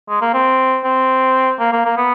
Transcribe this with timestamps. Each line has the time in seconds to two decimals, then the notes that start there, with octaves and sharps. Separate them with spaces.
0.09 G#3
0.21 A#3
0.34 C4
0.84 C4
1.59 A#3
1.72 A#3
1.85 A#3
1.97 B3